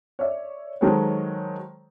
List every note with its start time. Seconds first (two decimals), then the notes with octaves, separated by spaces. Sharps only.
0.19 C#5 D5 E5
0.81 D#3 F#3 G#3 A4 C5 C#5